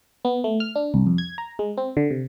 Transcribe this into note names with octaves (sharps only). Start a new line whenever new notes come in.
B3
A3
F6
D4
C2
F2
G#6
A#5
G#3
C4
D3
C3